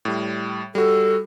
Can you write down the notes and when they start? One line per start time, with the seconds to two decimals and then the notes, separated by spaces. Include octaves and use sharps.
0.05 A2 G3
0.75 G3 F#4 A4